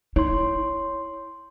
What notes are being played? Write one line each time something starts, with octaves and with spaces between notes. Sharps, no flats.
E4 C#5 C6